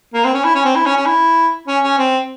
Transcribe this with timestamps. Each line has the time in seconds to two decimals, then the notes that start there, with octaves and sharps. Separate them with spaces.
0.14 A#3
0.25 C4
0.34 C#4
0.44 E4
0.55 C#4
0.65 C4
0.76 E4
0.86 C#4
0.96 C#4
1.06 E4
1.67 C#4
1.84 C#4
1.98 C4